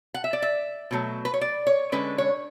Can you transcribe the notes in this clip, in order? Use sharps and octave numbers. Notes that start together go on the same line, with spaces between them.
F#5
E5
D5
E5
B2 F#3 A3
B4
C#5
D5
C#5
D3 G#3 C#4 B4
C#5